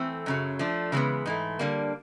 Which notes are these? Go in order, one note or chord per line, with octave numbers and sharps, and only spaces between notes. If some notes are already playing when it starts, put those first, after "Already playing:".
Already playing: E3 A3 C4
F#2 C#3 F#3
F3 A3 D4
C#3 E3 G#3 B3
G#2 E3 A3
D3 G3 A#3